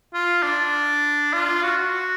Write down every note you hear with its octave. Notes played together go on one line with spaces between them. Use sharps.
F4
D4
F4
F#4
F#4